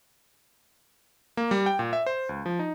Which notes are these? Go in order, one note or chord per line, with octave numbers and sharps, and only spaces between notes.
A#3
G3
G5
A#2
E5
C5
C#2
F3
D#4